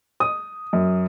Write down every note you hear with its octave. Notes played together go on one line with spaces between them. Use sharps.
D#6
F#2